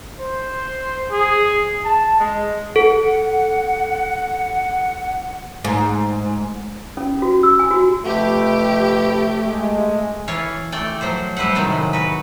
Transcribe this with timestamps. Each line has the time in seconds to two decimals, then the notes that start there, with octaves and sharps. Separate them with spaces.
0.19 C5
1.12 G#4
1.85 A5
2.19 G#3
2.76 A4 F#5
5.65 G#2
6.97 C#4
7.22 F#4
7.43 E6
7.59 G#5
7.71 F#4
8.05 F2 C3 A3 G4 B4
9.47 G#3
10.28 E3 C#5 F5 A5
10.72 A3 D5 G5
11.01 F3 F#3 C5
11.37 G3 B4 C5 E5 F#5
11.55 A2 C3 D#3 F#3 G#3
11.93 F#4 B4